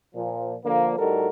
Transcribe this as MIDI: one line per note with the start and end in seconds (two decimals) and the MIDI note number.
0.15 0.55 46
0.15 0.55 53
0.65 0.95 50
0.65 0.95 53
0.65 0.95 58
0.99 1.28 45
0.99 1.28 55
0.99 1.28 63
0.99 1.28 66
0.99 1.28 69
0.99 1.28 70